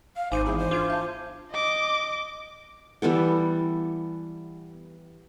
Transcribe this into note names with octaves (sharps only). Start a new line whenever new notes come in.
F5
G#1 D#4 C5 G#5 D6 D#7
E3 B3 E4 G#4
C5
D4 F4 D6 G#6
E5 A5 G6
D#5 D6
E3 G3 B3 A4